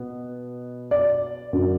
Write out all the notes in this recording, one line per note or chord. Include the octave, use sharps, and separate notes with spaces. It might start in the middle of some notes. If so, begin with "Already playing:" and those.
Already playing: B2 B3
D5
F#2 D3 F#3